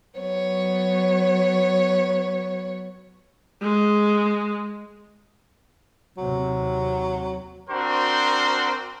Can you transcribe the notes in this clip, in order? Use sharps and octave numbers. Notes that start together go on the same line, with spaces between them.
F#3 B3 C#5
G#3
D#2 C3 F#3
C4 D4 F#4 A#4 C5